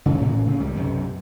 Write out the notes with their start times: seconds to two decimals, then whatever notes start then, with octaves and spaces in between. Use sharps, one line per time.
0.06 G2 C#3
0.21 A2 C#3 E3
0.46 C#3 C4
0.60 C#2 D#3 G3
0.75 B1 F#2 C3